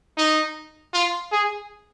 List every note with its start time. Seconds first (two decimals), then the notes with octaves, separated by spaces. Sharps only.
0.18 D#4
0.93 F4
1.32 G#4